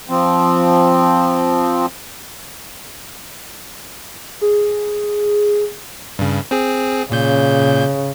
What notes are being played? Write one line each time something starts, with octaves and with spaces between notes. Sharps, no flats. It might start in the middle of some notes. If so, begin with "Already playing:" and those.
F3 C4
G#4
G2 C#3
C4 G#4
A#2 C#3 G6